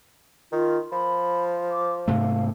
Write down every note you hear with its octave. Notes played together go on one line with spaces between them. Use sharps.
D#3 F4
F3 B5
D6
G#2 C3 A3 F5